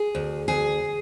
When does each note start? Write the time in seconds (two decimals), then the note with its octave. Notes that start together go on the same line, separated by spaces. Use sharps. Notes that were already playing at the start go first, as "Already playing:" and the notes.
Already playing: G#4
0.15 D2
0.48 D2 G#4